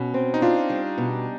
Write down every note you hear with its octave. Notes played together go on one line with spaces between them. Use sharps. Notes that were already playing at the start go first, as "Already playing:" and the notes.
Already playing: B2 C#4
C4
D#4
D4 F4
G3
B2